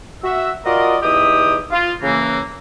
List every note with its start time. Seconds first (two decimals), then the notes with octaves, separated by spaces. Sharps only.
0.23 F#4 E5
0.65 F4 F#4 A#4 D5 D#5
1.02 E2 D#4 E4 G4 D#6
1.72 F4
2.02 C#3 E3 A#3